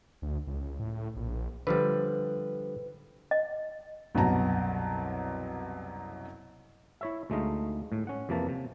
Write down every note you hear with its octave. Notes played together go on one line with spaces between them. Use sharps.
D2
C#2
A2
A#1
D3 F3 G3 B4
D#5
C2 F#2 B2 F#3 A5 A#5
E4 C#5 E5
D2 G#3 A3 D#4 D#5 F5
A2
C#4 F#5
F2 C3 E3 A#3 A5
C3